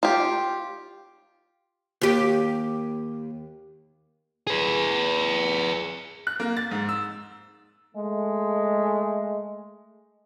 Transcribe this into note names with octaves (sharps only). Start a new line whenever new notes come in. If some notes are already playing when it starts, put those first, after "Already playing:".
F4 G4
D#2 G4
G#4 B4
F#6
A#3
A6
G#2
E6
G#3 A3